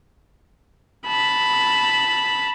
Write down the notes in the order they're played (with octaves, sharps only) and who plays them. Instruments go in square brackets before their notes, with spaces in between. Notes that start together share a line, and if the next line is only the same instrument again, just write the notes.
[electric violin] A5 B5